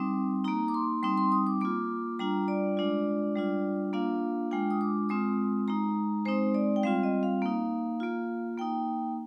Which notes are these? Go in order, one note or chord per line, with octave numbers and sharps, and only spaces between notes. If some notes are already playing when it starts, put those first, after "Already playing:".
Already playing: G3 C4 D#4 D6
A#3 D#4 A#5
D6
C6
G3 C4 D#4 C6
C6
D#6
D6
A#3 F4 D6
G3 D4 F4 A#5
D5
G#3 D4 F4
G3 D4 F4
A#3 D4 F4 F5
G#3 D4 F4 G5
D#6
D6
G#3 C4 F4 D#6
G#3 D#4 A#5
G#3 C4 D#4 C5
D5
G5
G3 C4 F4 F5
D#5
F5
A#3 D#4
A#3 F4
A#3 D#4 G5